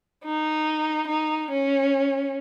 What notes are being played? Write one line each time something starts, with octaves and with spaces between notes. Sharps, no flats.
D#4
D#4
C#4